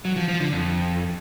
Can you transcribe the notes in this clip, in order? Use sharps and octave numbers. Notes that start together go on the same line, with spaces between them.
F#3
F3
F3
D3
F2